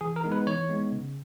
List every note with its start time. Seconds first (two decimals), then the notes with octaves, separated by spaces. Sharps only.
0.01 E3 G#4
0.16 A#4
0.24 G#3 B3 D#4
0.32 B4
0.47 E3 C#5
0.69 G#3 B3 D#4
0.92 C#3